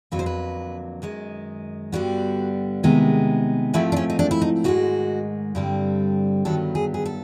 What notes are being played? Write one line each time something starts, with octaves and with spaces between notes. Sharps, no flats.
F2 D3 F#3 A#3 B4
C5
B4
F#2 D#3 G#3
G2 D3 G3 B3 F#4
C3 D#3 G#3 B3
G#2 F3 A3 C4 E4
D4
C#4
D#4
D4
E4
D#4
G#2 D#3 G#3 F#4
G2 D3 G3 C4
G2 D#3 F#3 B3 A4
G#4
G#4
A4